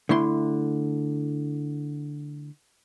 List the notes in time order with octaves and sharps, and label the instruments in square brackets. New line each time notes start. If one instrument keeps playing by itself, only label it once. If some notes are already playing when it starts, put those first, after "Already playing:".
[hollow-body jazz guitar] D3 A3 E4 C6